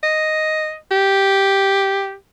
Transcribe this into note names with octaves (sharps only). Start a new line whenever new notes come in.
D#5
G4